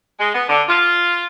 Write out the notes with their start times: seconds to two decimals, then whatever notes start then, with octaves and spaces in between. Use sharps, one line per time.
0.19 G#3
0.35 B3
0.49 D3
0.69 F4